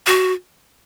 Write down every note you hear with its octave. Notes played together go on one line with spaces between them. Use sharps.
F#4